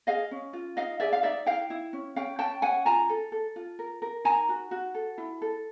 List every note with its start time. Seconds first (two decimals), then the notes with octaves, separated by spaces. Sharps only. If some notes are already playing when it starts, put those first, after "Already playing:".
0.07 G#4 D#5 F5
0.31 C#4
0.53 F4
0.77 D#4 D#5 F5
1.00 G#4 D5 E5
1.13 F5
1.23 D#4 D5 E5
1.46 E4 F5 G5
1.70 E4
1.93 C#4
2.16 C#4 F5 G5
2.39 C#4 G5 A5
2.62 C#4 F#5 G#5
2.85 F4 G#5 A#5
3.09 A4
3.32 A4
3.56 F4
3.79 A#4
4.02 A#4
4.24 D#4 G#5 A#5
4.49 F#4
4.71 F#4
4.95 A4
5.18 E4
5.42 A4